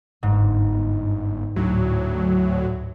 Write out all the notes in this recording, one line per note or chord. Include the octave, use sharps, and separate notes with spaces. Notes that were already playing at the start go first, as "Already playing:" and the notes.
G1 G#2
D2 A2 F#3